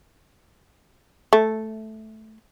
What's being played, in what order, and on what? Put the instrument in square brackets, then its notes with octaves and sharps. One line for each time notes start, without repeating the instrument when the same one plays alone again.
[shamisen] A3